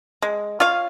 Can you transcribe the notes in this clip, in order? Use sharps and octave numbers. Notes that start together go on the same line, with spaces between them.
G#3
F4 C#5 F5